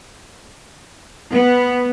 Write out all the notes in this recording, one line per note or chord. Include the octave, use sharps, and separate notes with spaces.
B3